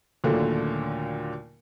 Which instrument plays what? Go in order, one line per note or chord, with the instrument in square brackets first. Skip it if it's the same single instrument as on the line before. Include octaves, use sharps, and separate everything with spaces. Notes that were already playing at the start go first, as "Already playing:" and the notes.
[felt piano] D#2 A#2 D3 F#3 A3 A#3